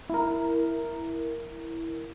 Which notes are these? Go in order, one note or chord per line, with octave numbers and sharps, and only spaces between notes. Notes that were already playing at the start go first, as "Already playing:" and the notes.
E4 A#4